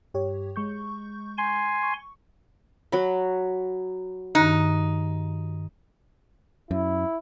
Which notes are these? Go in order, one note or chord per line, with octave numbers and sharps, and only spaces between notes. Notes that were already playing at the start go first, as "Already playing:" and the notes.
G2 G4 C#5
G#3 C#6 G6
G#5 C6
C#6
F#3 F#4 B5
G2 D#3 D#4 F#6
F#2 E4